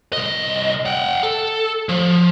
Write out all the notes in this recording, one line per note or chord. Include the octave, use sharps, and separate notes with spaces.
C2 D#5
F#5 G5
A4
F3